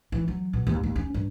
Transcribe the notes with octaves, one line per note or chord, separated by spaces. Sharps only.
E3
F#3
B2
D#2
D#2
C#4
G2